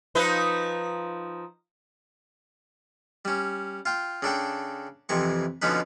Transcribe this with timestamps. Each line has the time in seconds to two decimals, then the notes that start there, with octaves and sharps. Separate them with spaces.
0.15 F3 D#4 B4
3.25 G3 C#4
3.86 F4 G5
4.22 C#3 D4 A4 G5
5.09 F2 C3 E3 C#6
5.62 B2 D3 F3 C#4 D#4 B4